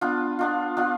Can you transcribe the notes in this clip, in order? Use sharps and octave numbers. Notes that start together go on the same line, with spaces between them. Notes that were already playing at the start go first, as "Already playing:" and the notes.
B3 D4 F4
B3 D4 F4
B3 D4 F4